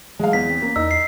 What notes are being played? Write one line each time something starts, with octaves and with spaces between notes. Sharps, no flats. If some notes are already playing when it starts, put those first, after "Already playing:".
E3 F#3 G#3 F5
E2 B6
C4
A#3 C#4
E2 D#4 E6
C7